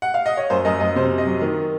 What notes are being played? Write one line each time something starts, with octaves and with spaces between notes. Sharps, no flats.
F#5
F5
D#5
C#5
F#2 C5
F#2 D#5
F#2 D#5
C3 C5
C3
D#5
F#3
D#3